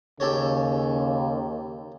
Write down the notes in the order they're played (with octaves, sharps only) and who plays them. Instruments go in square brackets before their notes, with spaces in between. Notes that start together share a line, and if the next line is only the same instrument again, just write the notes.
[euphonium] D#2 [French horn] C#3 [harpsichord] G4 A4 C#5